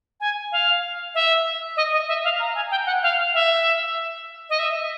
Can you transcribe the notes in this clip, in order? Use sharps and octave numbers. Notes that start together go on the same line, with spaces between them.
G#5
F5
E5
D#5
D#5
E5
F5
A#5
G#5
G5
F#5
F5
E5
D#5
E5